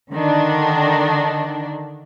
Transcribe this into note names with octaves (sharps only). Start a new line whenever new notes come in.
D3 D#3 D4